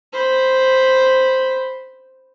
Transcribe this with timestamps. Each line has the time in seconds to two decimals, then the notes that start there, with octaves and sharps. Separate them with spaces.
0.13 C5 B5